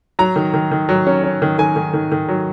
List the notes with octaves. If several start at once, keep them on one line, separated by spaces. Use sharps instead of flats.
F#3 A#5
D#3
D#3
D#3
F#3
C#4
C#4
D#3
D#3 G#5
D#3
D#3
D#3
F#3